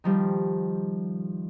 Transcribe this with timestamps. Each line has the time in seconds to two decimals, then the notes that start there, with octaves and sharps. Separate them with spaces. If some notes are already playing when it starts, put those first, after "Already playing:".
0.04 D#3 F3 G3